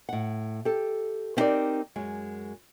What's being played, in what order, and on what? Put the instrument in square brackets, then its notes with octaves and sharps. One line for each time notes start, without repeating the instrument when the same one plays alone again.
[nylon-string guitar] A2 F#5
G4 A4
B3 C4 D#4 G4 A#4 D5
F#2 G#3